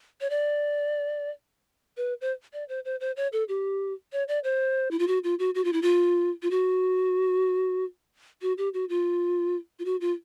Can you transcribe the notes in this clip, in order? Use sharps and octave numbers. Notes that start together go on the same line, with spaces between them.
C#5
D5
B4
C5
D5
C5
C5
C5
C#5
A4
G4
C#5
D5
C5
E4
F4
F#4
F4
F#4
F#4
F4
E4
F4
F4
F#4
F#4
G4
F#4
F4
F4
F#4
F4